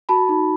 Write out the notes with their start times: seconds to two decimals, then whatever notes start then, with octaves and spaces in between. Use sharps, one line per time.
0.09 F#4 A5 B5
0.29 D#4